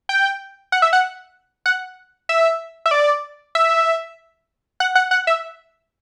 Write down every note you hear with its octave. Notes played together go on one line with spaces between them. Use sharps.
G5
F#5
E5
F#5
F#5
E5
E5
D5
E5
F#5
F#5
F#5
E5